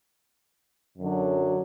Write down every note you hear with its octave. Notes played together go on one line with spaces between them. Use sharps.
F#2 D3 F#3 D4